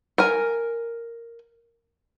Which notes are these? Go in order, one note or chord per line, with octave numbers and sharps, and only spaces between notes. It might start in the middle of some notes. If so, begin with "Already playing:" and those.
A#4 G#5